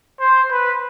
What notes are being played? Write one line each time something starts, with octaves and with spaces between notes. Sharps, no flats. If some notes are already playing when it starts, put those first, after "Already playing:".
C5
B4